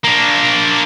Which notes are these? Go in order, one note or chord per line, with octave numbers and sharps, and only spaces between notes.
A#3 D4